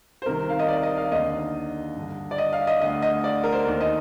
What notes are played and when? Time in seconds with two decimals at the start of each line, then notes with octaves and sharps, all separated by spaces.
0.22 C5
0.26 C2 C3 D#3 A#4
0.49 F5
0.59 D#5
0.68 D5
0.83 D#5
0.97 F5
1.11 D#2 D3 D#5
1.96 G2 D3
2.31 D5
2.38 D#5
2.53 F5
2.67 D#5
2.81 D2 D3 D#5
3.02 D#5
3.24 D5
3.44 A#4
3.53 C5
3.66 D#2 D#3
3.81 D#5